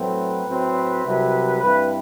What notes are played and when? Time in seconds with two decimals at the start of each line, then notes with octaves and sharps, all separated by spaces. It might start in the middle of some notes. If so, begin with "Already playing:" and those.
Already playing: A2 F#3 A3 C4 B4
0.45 A2 F#3 C4
1.04 C2 C3 F#3
1.60 G2 E3 A3 C4 B4